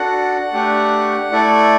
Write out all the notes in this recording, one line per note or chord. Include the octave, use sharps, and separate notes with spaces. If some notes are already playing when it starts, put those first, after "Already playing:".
Already playing: D4 F#4 A4 F#5
A3 D4 G4
A3 E4 A4 D5